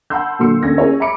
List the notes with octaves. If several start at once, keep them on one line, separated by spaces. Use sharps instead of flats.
F#5 A5 B5 C6 E6 G6
A#2 D3 F#3 C6 E6 C#7
D#2 D3 C#4 E6 G#6 A#6
C#4 E4 G#4 A#4 C#5
E5 A#5 B5 D6 C#7 D7